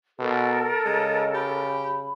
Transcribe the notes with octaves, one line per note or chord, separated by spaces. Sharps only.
B2 A4 A#4
C#3 G#3 D#5
G4 B5